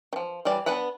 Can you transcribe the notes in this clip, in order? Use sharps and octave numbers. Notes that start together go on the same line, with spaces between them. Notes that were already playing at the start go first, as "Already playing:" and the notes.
D#3 F3
E3 G3 D5
B3 D4 B4 F#5 B5